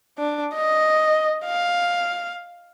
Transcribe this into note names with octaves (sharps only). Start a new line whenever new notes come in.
D4
D#5
F5